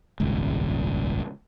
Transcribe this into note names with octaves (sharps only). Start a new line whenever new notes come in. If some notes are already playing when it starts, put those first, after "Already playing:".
D#1 G#1 C#2